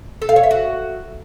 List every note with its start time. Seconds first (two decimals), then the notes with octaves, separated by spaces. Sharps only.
0.22 A4
0.29 F5
0.36 C#5
0.43 E5
0.51 F#4